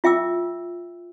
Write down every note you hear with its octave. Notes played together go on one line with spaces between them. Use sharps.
F4 E5 G5 D6 E6